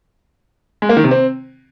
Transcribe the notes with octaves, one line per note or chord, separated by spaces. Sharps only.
G#3
A#3
D#3
C3
C4